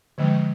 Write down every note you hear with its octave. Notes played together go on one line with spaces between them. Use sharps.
D3 F3 G#3